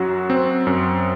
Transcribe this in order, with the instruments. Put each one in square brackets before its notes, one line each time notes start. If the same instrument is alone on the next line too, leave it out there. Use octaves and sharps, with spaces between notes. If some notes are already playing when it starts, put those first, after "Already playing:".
Already playing: [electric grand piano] F#2 F#3 F#4
C4
F#2